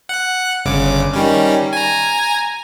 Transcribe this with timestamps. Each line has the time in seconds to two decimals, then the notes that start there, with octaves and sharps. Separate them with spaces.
0.09 F#5 F#6
0.65 G1 C#3 D6
1.14 D#3 G3 C#4
1.73 G#5 A#5